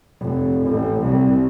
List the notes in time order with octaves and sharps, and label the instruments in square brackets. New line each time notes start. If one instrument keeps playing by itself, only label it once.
[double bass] F1
A1
C2